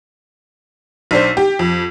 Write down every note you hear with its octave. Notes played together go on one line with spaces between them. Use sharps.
B1 D4 C5
G4
F2